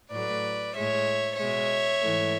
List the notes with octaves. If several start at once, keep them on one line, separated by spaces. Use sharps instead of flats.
A2 F#3 A3 B4 D5
A2 G#3 C#5 E5
B2 G#3 C#5 E5
G#2 E3 A3